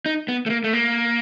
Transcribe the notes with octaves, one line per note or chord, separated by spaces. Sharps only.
D#4
B3
A3
A#3
A3
A#3